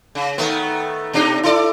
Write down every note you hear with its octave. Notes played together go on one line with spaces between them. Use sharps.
C#3
D#3 A3 B3
B2 D4 D#4
E4 A4 D5